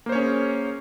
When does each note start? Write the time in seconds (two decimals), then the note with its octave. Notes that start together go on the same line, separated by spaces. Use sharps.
0.06 A#3
0.09 C5
0.12 C#5
0.15 C#4
0.18 G#4